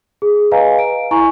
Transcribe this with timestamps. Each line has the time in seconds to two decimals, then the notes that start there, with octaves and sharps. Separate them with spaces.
0.22 G#4
0.51 B4 D#5 F5 G#5 A#5
0.79 D7
1.11 E4 G#5 A#5 C#6